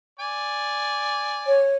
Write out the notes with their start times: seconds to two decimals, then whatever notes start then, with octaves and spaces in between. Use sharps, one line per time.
0.19 D5 G#5
1.47 C#5